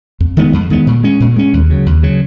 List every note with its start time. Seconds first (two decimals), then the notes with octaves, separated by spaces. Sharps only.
0.20 F2
0.37 D#3 G#3 B3
0.53 F2
0.70 D#3 G#3 B3
0.87 A#2
1.03 G#3 C#4
1.20 A#2
1.36 G#3 C#4
1.53 D#2
1.70 C#3 F#3
1.86 D#2
2.03 C#3 F#3